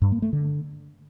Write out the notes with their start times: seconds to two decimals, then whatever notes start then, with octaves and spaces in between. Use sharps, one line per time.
0.02 G2
0.12 A#3
0.22 A3
0.33 D3